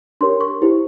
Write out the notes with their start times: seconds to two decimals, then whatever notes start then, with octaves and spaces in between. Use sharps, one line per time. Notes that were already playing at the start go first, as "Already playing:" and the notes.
0.21 D4 G4 A#4 C#5 C6
0.41 C#6
0.62 E4 G4 C5